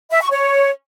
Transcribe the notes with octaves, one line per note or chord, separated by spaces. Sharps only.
E5
C#6
C#5